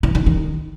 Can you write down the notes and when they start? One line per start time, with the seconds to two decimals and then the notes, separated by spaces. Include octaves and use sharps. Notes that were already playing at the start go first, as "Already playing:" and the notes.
0.03 E3
0.15 D#3
0.26 D#3